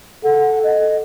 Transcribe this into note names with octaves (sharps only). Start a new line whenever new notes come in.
A4 F#5
D#5